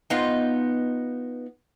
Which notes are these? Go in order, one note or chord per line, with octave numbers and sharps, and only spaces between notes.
B3 D#4 F4